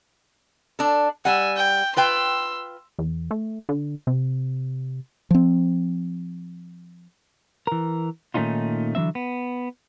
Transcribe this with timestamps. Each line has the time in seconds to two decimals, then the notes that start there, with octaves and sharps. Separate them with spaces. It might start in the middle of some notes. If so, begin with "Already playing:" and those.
0.79 D4 A4
1.25 G3 F#5 G#5 E6
1.57 G5
1.97 F4 B4 G5 C6 E6
2.99 E2
3.31 A3
3.69 D3
4.07 C3
5.31 F3 C4
7.67 E3 A#4
8.34 A#2 D#3 A3 C#4 D#4 F4
8.95 D3 E3 F#3 C4 E5
9.15 B3